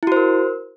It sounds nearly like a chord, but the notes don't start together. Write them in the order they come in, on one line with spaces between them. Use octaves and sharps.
E4 F#4 C5 A#4